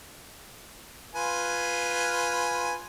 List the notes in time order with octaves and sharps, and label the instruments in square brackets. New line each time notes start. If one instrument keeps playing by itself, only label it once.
[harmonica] F4 B4 G#5